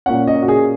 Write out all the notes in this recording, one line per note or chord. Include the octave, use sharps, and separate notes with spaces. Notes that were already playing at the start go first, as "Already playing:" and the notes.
A#2 A#3 C#4 F#5
D#5
F#4
G#4